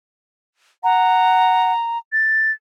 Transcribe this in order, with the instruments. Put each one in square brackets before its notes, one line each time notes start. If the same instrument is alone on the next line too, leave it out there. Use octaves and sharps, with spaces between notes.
[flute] F#5 [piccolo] A#5
[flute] A6